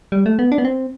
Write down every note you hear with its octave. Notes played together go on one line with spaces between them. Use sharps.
G3
A3
B3
D4
B3
C4